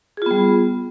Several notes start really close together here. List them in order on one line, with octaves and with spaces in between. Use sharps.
G#4 F4 B3 G3